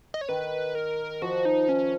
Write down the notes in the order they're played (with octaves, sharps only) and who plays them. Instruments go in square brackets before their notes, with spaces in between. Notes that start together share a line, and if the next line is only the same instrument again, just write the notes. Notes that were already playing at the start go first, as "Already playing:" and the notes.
[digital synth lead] D#5
C#5
[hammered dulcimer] D#3 [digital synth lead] B4
[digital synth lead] A#4
[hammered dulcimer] F3 [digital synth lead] F#4
[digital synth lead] D#4
C#4